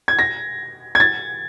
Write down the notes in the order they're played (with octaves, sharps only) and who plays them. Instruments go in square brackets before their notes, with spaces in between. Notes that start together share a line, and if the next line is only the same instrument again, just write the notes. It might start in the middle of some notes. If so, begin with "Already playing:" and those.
[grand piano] G#6
A#6
G#6
A6